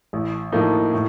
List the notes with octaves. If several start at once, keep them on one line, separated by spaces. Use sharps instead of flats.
A1
A2 F3 A#3 D#4
A2